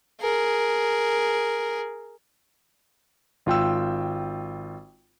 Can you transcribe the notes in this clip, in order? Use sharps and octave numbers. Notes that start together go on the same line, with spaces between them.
G#4 A#4
G#1 F4 G5 E6